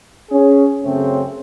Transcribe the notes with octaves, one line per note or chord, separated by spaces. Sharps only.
C#4 G#4
F#2 C#3 A3 C4 C#4